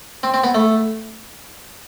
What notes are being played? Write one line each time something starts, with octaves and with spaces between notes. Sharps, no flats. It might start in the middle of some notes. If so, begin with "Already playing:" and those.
C4
C4
B3
A3